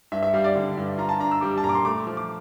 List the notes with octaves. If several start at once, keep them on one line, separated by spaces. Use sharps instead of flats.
G2 E5
E5
G3 F5
D5
D3
G2
F4 A#5
A5
D4 A#5
E6
G3 D6
A5
A#2 A#5
D6
C6
A3 D6
F3
D6